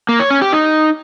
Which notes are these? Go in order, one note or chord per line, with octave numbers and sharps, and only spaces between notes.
A#3
C#5
C#4
G4
D#4